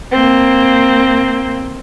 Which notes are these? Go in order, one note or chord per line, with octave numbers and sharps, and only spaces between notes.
A#3 C4